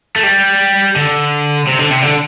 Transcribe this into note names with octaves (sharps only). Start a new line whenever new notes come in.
A3
G3
D3
C3
D3
C3
D3